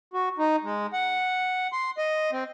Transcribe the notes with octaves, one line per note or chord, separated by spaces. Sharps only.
F#4
D#4
G#3
F#5
C6
D#5
C4